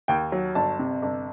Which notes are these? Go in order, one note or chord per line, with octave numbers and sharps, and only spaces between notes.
D#2 G5
F#3
G1 A5
C3
G1